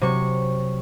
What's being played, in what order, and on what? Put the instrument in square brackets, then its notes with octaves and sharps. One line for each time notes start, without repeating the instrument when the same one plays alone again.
[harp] C3 F#3 C#6